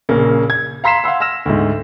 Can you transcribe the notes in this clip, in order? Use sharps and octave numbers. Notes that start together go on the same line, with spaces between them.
A#1 C#3 A#3
G#6
F5 A#5 C6 B6 C7 E7
F5 F#5 C6 E6
E6 F6 A#6 E7
D2 G#2